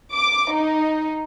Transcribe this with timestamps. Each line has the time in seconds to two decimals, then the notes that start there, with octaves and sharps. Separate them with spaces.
0.14 D6
0.53 D#4